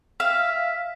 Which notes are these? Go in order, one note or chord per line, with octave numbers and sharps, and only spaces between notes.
E5 F5